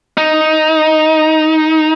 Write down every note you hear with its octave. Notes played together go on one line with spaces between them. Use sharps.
D#4